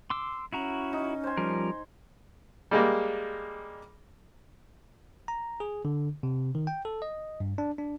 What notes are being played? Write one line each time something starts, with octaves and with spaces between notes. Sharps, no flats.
C6 D6 E6
C#4 E4 F#4 A#5
D#4
C5 G#5
F3 G3 A#4
G3 G#3 A#3
A#5
G#4
D3
C3
D#3
G5
A4
D#5
G2
D4
D4